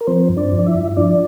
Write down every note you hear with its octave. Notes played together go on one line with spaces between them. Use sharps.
A#4
F3 C4 C5
G2
D4 D5
F3
D5
E4 E5
G2
F3 D4 D5